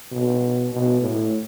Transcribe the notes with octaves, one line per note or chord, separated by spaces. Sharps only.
B2
B2
A2